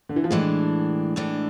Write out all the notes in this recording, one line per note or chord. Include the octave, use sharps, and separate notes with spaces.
D3
E3
F3
A2 E3 G#3 A3 D4
A2 E3 A3 D4